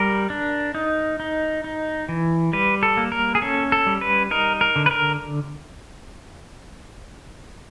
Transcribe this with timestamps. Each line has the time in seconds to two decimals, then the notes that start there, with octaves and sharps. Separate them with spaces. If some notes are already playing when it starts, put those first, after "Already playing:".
Already playing: G3 A#4
0.30 D4
0.75 D#4
1.20 D#4
1.64 D#4
2.09 E3
2.53 G3 B4
2.83 A4
2.97 A#3
3.12 A#4
3.35 G#4
3.42 C#4 A4
3.72 A4
3.87 G3
4.01 B4
4.31 D#4 A#4
4.61 A#4
4.76 D3
4.86 B4
4.91 A#4